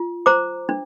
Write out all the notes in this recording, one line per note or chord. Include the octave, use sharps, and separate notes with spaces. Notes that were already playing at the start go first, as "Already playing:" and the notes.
Already playing: F4
C5 A#5 D6
D4